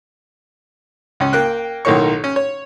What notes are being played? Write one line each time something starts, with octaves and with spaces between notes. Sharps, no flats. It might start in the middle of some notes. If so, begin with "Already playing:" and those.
C#2 C#4
A#3 G5 F#6
B1 A2 D#3 A#3 C#5 C#6
C#4
C#5